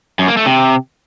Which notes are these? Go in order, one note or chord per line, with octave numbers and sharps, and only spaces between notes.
F#2
A#3
A3
C3